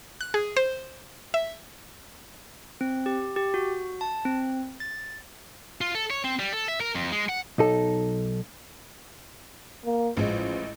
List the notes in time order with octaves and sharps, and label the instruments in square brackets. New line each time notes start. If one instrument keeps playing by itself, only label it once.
[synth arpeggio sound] F#6
G#4
C5
E5
[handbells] C4
G4
G4
F#4
A5
C4
A6
[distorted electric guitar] F4
A4
C#5
C4
G3
A4
E5
A#4
F2
G#3
F#5
[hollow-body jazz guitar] B1 D#4 A4
[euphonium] A#3
[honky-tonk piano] A1 G#3 [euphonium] F3